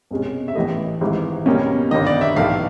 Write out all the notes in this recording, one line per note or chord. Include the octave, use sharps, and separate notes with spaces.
C2 B2 G#3 C#4
E5
A1 A2 E3 A3 D#5
G#1 G#2 E3
C#2 B2 G3 A#3 C#4
G1 G2 D#3 D#5
D5
E5
B1 A2 E3 A3 F5